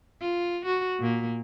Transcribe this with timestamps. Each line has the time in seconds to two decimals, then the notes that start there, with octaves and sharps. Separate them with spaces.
0.21 F4
0.66 F#4
1.00 A#2 A#3